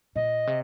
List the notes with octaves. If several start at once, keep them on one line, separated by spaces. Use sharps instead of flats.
A#2 D#5
C3